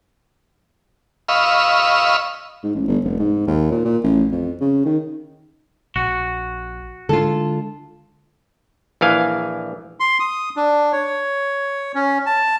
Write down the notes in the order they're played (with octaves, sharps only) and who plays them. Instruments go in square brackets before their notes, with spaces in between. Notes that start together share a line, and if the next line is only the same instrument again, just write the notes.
[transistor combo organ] D#5 F5 B5 C#6 E6
[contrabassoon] G#2
A1
G1
F1
G#2
D#2
A#2
A#2
A1
F2
C#3
D#3
[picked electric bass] A#1 [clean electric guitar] F#4
[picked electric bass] D3 G#3 D4 [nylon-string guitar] F4 A4
[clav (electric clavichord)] A#1 E3 F5 G#5
[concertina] C6
D#6
D4
C#5
C#4
A5